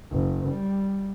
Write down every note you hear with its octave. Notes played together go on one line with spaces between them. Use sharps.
F#1
G3